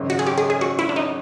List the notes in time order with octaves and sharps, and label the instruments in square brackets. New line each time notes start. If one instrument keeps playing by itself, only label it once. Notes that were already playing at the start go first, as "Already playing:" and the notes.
Already playing: [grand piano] G#1 F#2 C#3
[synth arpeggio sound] F#4
G#4
G4
G#4
G#4
F#4
E4
D4
D#4